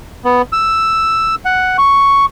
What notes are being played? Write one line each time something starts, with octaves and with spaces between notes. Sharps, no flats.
B3
E6
F#5
C#6